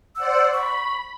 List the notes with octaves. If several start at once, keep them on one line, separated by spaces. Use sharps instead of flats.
C5 D5 F#5 E6
B5 C#6